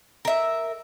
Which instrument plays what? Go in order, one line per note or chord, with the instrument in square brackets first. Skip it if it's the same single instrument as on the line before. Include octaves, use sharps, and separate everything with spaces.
[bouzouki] A#4 E5